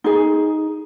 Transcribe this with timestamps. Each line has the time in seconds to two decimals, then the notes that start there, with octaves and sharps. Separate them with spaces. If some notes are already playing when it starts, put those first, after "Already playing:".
0.04 D#4 G#4